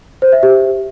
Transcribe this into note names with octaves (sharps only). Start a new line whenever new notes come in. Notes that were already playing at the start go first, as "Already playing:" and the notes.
C5
E5
G4